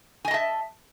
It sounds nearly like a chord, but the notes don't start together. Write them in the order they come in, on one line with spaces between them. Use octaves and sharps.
G#5 D#5 A5 E5